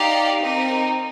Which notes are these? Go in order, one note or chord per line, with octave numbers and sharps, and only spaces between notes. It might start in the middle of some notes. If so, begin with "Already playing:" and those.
Already playing: D#4 G4 D5 F5
C4 D#4 A#4